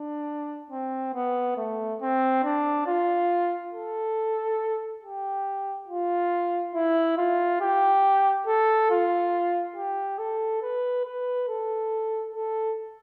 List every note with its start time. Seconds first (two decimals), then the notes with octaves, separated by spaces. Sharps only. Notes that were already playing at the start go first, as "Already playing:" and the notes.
Already playing: D4
0.71 C4
1.14 B3
1.57 A3
2.01 C4
2.44 D4
2.87 F4
3.73 A4
5.02 G4
5.88 F4
6.75 E4
7.17 F4
7.61 G4
8.47 A4
8.91 F4
9.76 G4
10.19 A4
10.62 B4
11.05 B4
11.48 A4
12.34 A4